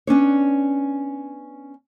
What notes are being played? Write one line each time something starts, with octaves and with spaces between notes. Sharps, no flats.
B3 C#4 D4 C#5